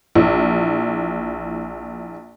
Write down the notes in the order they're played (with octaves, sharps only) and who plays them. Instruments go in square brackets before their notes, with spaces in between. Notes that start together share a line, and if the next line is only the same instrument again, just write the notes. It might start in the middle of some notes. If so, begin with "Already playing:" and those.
[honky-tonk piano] A#1 E3